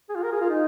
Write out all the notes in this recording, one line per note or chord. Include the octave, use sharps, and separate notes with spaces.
G#4
F4
A#4
G#4
F4
D#4